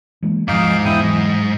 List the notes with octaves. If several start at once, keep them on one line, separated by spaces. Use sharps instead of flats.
E3 G#3 A#3
D#2 G#2 F3 D#4 F5 D6
E2 B3 D4 E4 G5 D#6
E3 F#3 D#5